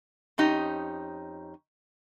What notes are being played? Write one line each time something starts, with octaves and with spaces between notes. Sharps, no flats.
F2 C#4 D#4 G4